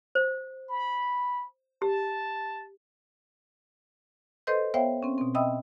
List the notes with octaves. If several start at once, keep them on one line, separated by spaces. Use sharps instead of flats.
C5
B5
G4 A5
A4 B4 C5 D#5 C6 G6
B3 C5 C#5 E5 F5 G5
C4 C#4
B2 C4
D#5 E5 G5 B5 D#6 E6